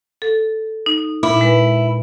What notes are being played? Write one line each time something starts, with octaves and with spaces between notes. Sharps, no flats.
A4
D#4
A#2 E4 B5
G#3 B4